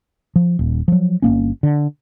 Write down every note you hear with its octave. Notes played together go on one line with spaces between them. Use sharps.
F3
D#1
F3 F#3
G1 A2 A#3 C#4
D3